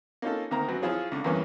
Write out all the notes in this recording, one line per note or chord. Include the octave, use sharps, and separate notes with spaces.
A#3 C#4 D#4 F4 A4
D2 D#3 A#3 A#5
F#2 F#3 B3
F3 E4 F4 G#4 C#5
C#2 D3
E2 G2 E3 A#3 B3 C#4